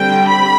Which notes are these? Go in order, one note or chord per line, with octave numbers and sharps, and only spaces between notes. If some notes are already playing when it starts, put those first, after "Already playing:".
Already playing: D3 G3 C4 G5
B5